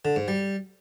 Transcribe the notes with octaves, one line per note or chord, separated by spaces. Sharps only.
D3
G#2
G3